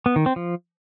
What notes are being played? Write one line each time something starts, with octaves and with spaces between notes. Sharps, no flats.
B3
D#3
C4
F3